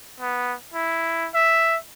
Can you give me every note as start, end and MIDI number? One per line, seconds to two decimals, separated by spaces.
0.20 0.54 59
0.74 1.29 64
1.34 1.77 76